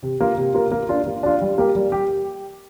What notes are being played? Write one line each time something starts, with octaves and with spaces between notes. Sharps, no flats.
C3
A#3 F4 A#4
C3
A#3 F4 A#4
A#3
D4 F4
A#3
D4 F4
G3
A#3 G4
G3
G4